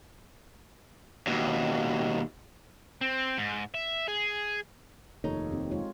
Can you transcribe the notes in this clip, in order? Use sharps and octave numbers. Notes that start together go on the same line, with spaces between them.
D#2 B2
C4
G#2
E5
G#4
F1 D#2 D#4 F4 A4 C#5
C4 G4
G#3 F4 C#5